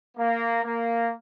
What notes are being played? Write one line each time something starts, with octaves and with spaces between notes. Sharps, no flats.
A#3
A#3